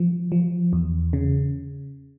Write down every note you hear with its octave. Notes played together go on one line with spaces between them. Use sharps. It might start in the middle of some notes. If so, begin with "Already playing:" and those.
Already playing: F3
F3
E2
C#3